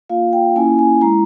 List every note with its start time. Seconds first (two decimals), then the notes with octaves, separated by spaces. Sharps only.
0.09 A#3 F4 F5
0.33 G5
0.56 A#3 C#4 E4 G#5
0.79 G#5
1.01 G#3 E4 A#5